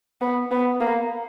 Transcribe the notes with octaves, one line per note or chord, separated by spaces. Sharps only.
B3
B3
A#3